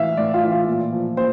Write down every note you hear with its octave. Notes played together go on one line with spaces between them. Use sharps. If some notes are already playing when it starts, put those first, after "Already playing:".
Already playing: A2 E3 E5 F5
A2 D5
F4
E3
F4
A#2
F3
A#2 C5